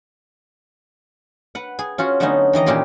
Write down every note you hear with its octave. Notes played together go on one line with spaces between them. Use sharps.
B4 F#5
G#4
C#4 F4 F#4 F#5
D3 F#3 A3 B3 C#4 D#4
D#3 E3 D#5 A#5
A#2 C#4 D#4 G4 B5 C6